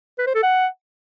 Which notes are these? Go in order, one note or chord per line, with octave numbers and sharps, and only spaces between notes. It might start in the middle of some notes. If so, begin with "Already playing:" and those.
B4
C5
A4
F#5